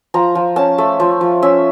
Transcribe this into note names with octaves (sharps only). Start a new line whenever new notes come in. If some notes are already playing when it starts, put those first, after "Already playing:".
F3 A#5
F3
C#4 A5
A3
F3
F3
C#4 E5